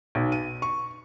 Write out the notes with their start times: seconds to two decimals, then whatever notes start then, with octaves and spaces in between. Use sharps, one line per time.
0.15 B1
0.32 D#7
0.62 C#6